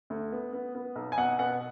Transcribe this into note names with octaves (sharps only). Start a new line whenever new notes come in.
D2
B3
B3
B3
B1
G#5
B2 F#5
B3 F#5